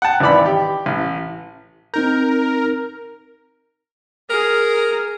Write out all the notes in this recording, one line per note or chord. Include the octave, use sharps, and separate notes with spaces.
F#5 G5 A5
G#1 E3 D5 B5
G4
A1
C4 D#4 A#4 G6
G#4 A#4